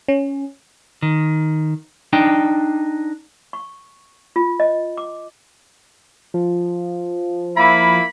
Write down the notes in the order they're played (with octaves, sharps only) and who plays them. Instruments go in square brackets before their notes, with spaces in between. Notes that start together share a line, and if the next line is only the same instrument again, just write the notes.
[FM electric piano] C#4
[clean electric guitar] D#3
D4 D#4 G5
[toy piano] C#6
F4
D#5
D6
[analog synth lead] F3
[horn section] A#3 E4 [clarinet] B5